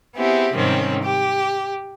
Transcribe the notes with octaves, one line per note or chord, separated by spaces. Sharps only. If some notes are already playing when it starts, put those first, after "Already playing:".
B3 C4 E4 G4 G#4
G#2 C3 D#3 G3 C4 C#4
G4